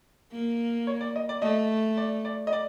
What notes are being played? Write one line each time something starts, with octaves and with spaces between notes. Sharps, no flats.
A#3
C#5
D5
D#5
D5
A3 D#5
D5
D5
D#5
D5